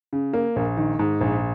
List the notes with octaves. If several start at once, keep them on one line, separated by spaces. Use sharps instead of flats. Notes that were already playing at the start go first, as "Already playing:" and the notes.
C#3
A#3
A#1
D#3
G#2
A#1